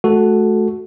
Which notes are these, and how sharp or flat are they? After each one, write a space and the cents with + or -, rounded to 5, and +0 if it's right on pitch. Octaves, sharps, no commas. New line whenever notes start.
A3 -35 F#4 +0 A4 +0